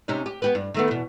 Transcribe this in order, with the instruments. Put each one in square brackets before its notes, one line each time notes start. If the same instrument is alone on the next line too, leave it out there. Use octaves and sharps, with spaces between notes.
[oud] C3 C#4 D#4
G4
B3 G4 B4
G2
D#3 A3 B3
E2 B2